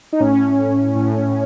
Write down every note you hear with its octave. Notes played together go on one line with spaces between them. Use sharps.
D#4
A2 C#4
A2